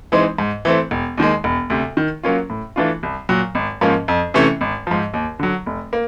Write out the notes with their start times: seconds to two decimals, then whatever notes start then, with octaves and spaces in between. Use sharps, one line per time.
0.12 E3 G#3 C4 D#4
0.38 G#2
0.65 E3 A3 C4
0.91 E1
1.18 D#2 D#3 G#3
1.44 E1
1.70 D2 C3
1.97 D#3
2.23 F#3 A#3 C#4 F4
2.50 A2
2.76 E3 A3 D4 F4
3.03 C2
3.29 A#2 F#3
3.55 G#1
3.81 G#2 F3 A#3 C#4
4.08 F2
4.34 C3 E3 A3 C#4
4.61 G#1
4.87 G#2 F3
5.14 D#2
5.39 D3 F#3
5.66 F1
5.93 A#3